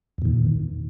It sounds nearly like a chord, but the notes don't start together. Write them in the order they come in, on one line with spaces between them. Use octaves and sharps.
E2 A#2 D#3